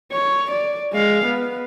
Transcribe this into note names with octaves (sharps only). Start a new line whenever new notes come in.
C#5
D5
G#3 F5
B3